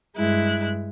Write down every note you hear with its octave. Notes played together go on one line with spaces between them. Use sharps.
G2 G#3 E4 F#6